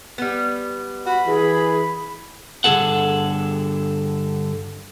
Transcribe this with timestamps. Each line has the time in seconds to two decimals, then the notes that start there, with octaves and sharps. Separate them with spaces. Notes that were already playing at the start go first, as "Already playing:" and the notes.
0.18 G3 B3
1.06 F#4 B5
1.27 E3 G#4
2.64 G2 D3 D#3 G#4 A4 F#5